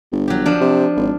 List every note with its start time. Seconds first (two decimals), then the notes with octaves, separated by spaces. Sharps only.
0.12 G1
0.28 F#3 G4
0.46 F3 D4
0.61 C3
0.96 G#1